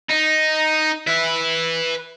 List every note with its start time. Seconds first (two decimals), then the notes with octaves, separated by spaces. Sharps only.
0.11 D#4
1.07 B4 E5